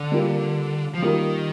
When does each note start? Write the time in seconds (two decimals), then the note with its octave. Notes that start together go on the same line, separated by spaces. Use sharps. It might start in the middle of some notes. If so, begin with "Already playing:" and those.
Already playing: D3
0.12 G3 A#3 F4 A#4
0.95 F3
1.02 D#3 G3 A#3 F4 A#4